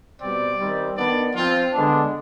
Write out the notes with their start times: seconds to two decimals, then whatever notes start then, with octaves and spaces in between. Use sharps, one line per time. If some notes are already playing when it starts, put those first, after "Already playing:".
0.21 B2 G3 C4 D5
0.59 D#3 G3 C4
0.96 D#3 B3 D4 D5
1.35 F3 C4 F4
1.73 D3 G#3 B3 D4